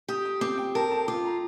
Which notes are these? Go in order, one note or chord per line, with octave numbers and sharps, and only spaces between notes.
G4 D#6
D#6
C4 D6
G5
A#4 A5
A5
F4 D6
A#5